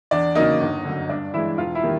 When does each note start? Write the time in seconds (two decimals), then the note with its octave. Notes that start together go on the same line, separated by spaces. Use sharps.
0.11 E2 D4 D5
0.35 C#3 F#3 A#3 D#4 D#5
0.60 G1
0.85 F#2 D3
1.09 G2 D4 D5
1.34 E3 G#3 E4 E5
1.58 E1 F4 F5
1.75 E4 E5
1.83 D#3 G3 A#3